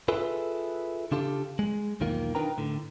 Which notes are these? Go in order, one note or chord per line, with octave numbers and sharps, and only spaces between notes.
E4 F4 G#4 A4 B4
C#3 D4 F4 G4 A4
G#3
B1 E2 D#3 A#3 F4 A#4
D4 D#4 A#4 B4 G5 A#5
A2 D3